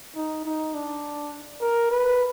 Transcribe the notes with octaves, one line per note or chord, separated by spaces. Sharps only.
D#4
D#4
D4
A#4
B4